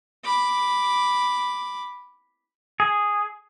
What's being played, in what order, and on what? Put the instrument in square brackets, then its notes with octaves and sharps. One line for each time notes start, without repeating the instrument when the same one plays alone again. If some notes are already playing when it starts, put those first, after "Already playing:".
[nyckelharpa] B5 D6
[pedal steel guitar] G#4